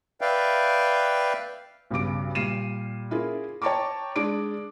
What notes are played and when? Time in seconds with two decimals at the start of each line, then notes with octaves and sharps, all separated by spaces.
0.21 B4 D5 E5 F5 G5
1.91 B1 G2 C#3 D6 D7
2.35 A#2 G3 C7 D#7 E7
3.11 C#4 E4 F4 G#4 A#4
3.62 C#5 G5 A5 A#5 C#6 D6
4.16 G#3 D4 D5 D6 D7